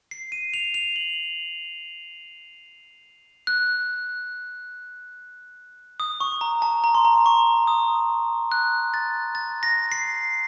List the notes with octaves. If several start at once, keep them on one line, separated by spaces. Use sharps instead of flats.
C7
D#7
F7
F7
F#7
F#6
D#6
C#6
A#5
A5
A#5
C6
A#5
C#6
D#6
F#6
A6
A6
A#6
C7